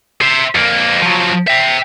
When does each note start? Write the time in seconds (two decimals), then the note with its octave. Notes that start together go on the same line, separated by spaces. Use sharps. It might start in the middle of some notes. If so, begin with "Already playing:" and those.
0.22 C5 E5
0.55 F2 A#3
1.02 F3 F#3
1.48 E5 G5